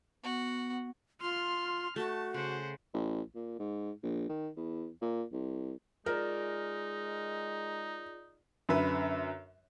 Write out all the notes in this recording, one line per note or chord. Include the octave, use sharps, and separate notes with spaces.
B3 F#4
F4 C6 F6
A3 F#4 A5
C#3 C5 F#5
A1
A#2
G#2
A#1
D#3
E2
A#2
C2
G#3 D#4 F4 G#4 A#4 D5
F#2 D3 B4 E5